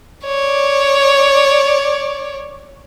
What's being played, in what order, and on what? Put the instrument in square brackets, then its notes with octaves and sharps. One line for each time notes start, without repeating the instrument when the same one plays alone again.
[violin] C#5 D5